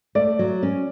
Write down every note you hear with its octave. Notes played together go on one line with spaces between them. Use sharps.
A3 D5
F#3
C#4